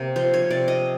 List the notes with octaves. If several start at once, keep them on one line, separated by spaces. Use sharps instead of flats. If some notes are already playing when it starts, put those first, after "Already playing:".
Already playing: C3 A#3
F3 C5
C#5
C3 D5
D#5